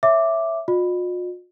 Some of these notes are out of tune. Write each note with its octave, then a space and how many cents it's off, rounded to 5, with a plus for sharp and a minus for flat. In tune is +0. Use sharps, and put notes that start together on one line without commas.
C#5 +0 E5 +0 D6 +0
F4 +45 D#5 -45